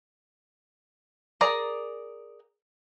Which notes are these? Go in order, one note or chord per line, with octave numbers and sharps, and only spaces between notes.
G#4 A#4 D5 A#5